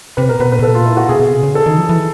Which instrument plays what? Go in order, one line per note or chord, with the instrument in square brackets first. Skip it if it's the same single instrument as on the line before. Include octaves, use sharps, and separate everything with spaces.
[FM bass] C3 [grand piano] B4
[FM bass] B2 [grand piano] A#4
[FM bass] B2 [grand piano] B4
[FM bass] A#2 [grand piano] B4
[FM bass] B2
[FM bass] A#2 [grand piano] A4
[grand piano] F4
E4
F#4
[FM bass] B2 [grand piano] G#4
[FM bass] B2
C3
C#3
[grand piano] A4
[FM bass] D#3
F3
E3